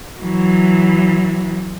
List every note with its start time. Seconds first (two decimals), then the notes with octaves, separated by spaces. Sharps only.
0.21 E3 F#3